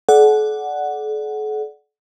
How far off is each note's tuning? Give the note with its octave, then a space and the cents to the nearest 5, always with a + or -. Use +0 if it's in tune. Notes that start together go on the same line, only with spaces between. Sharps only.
A4 -45 D5 +0 F#5 +0